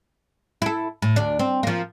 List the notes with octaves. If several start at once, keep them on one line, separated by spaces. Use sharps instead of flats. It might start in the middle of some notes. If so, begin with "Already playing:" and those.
E4 A4
A2
D2 D4
C4
F3 A#3